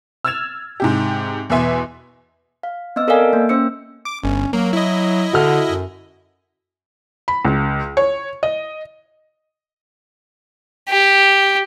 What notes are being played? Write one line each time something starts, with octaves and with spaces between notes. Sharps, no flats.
E6 F6 G#6 A6 E7 F7
G#2 C3 G4
E2 B2 B3 E5 G#5 C6
F5
B3 C4 D#5 E6
A4 A#4 D5 D#5 F5 G#5
A#3
C#4 C5 E6 C#7
D6
G1 C#4
F#3 A#3
E4 D#5
D3 F#4 A4 F6
F#2
B5
C#2
C#5
D#5
G4